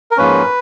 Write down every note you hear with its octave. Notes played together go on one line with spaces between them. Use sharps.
A#4
G#2 F3 A#3 C#4 B4